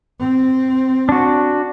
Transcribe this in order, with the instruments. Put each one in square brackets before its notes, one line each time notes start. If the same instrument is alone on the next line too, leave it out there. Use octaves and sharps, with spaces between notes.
[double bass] C4
[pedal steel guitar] D4 F#4